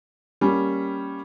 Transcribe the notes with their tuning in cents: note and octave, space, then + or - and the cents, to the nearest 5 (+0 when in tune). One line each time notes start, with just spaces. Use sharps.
G3 +0 A#3 +0 C#4 +0